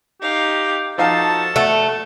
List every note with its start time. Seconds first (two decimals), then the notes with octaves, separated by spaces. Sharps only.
0.22 D#4 G4 F5
0.98 F3 D#4 F#4 A4 F5 A5
1.56 A3 F#5